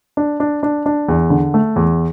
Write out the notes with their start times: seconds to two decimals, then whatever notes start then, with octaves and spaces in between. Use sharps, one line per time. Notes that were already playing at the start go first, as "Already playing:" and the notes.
0.17 D4
0.40 D4
0.63 D4
0.86 D4
1.08 E2
1.30 D3
1.54 A3
1.76 E2